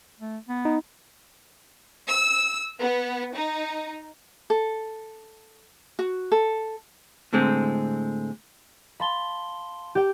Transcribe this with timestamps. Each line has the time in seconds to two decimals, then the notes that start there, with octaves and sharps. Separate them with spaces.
0.20 A3
0.48 B3
0.65 D#4
2.08 E6
2.80 B3
3.34 D#4
4.50 A4
5.99 F#4
6.32 A4
7.33 A2 D3 G#3 C4
9.00 F5 A5 B5 C6 G7
9.95 G4 G5